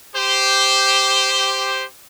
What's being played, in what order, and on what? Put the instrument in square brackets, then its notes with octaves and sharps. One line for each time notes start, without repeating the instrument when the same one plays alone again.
[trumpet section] G4 C5